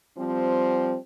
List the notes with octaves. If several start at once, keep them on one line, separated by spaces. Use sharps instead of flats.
F3 G3 C4